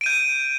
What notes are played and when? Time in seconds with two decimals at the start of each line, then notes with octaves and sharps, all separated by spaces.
0.01 D7
0.04 D#7
0.06 G6